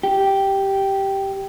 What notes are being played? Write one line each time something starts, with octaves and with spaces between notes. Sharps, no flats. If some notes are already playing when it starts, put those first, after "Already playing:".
G4